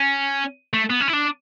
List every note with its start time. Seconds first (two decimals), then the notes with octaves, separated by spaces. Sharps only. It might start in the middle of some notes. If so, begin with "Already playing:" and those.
Already playing: C#4
0.74 A3
0.90 B3
1.00 C#4
1.08 E4
1.13 D4